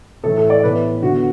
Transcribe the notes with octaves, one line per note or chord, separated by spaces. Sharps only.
A2 E3 A3 A4
A4
D5
A2 E3 B3 B4
D3 B3 F#4